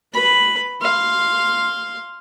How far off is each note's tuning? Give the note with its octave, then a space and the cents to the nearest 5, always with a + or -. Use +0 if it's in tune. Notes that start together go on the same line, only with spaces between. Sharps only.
B4 +0 B5 +0
F5 -5 C6 +0